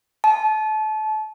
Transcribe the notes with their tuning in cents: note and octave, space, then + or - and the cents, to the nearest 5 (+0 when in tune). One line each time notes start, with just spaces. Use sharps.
A5 -30